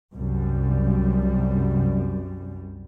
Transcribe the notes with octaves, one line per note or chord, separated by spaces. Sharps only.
C2 F#2 G3